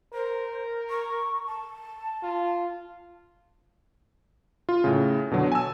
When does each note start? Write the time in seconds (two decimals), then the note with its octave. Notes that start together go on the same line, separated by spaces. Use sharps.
0.14 A#4 C5
0.90 C#6
1.47 A5
2.23 F4
4.69 F4
4.84 A2 C#3
5.31 B2 D3 F#3
5.52 G#5 A5 E6